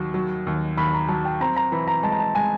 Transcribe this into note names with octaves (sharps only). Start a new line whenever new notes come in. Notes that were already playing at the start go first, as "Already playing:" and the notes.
Already playing: D#2 F#3
F#3
D#2
D#2 B5
A#5
F#3 A5
G5
C4 A#5
A#5
E3 B5
A#5
G#3 A5
A#5
A5
G#3 G#5